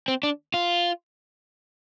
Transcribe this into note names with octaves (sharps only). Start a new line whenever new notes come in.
C4
D4
F4